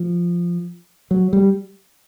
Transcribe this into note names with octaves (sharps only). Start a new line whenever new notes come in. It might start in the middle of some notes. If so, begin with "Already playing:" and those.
Already playing: F3
F#3
G3